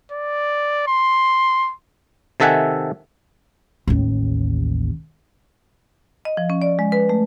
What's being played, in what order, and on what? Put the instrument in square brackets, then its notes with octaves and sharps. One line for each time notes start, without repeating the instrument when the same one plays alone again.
[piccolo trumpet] D5
C6
[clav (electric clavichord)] C3 D#3 A4 E5 F#5 G#5
[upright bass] A1 D#2
[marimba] D#5
F3
C#4
D5
G#3
B4
A3